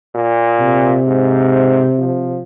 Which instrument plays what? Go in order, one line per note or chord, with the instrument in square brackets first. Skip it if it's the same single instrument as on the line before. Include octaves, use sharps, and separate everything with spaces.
[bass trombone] A#2
[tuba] C3
[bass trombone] G#2
F3